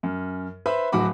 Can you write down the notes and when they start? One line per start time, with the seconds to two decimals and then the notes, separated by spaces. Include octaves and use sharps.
0.03 F#2
0.66 B4 C5 E5 B5
0.92 D1 F#3 F#4 B5 D6